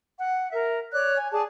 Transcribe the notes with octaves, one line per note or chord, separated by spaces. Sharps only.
F#5
A#4 E5
C#5 D5 F#6
G#5
G#4 D5 A5